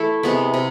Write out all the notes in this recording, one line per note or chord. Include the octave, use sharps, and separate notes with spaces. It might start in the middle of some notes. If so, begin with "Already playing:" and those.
Already playing: E3 A3 E4 A4
C3 G#3 B3
C3